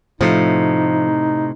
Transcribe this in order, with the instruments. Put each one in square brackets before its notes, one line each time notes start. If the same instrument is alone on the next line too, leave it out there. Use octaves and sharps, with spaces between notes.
[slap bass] A2 C3 [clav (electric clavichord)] F3 A3 [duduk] D#4